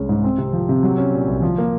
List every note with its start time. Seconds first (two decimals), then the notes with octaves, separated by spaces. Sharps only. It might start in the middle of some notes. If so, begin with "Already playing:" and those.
Already playing: C2 G#3 C#4
0.09 G#2
0.24 C4
0.38 C3
0.53 F3
0.69 C3
0.83 F#3
0.98 C#4
1.13 A#2
1.28 C2
1.42 F3
1.58 A#3